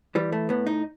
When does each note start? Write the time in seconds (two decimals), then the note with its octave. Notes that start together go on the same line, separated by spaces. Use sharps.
0.15 E3 G3
0.32 A3
0.49 A2 B3
0.66 D#4